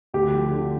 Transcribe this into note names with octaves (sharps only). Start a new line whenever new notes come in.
D2 G4
F3
D3